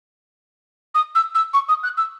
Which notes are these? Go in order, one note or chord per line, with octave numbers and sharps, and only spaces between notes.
D#6
E6
E6
C#6
D#6
F#6
E6